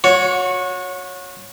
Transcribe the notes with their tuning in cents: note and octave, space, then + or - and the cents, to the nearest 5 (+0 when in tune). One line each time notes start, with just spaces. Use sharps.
F#4 -30 C#5 +0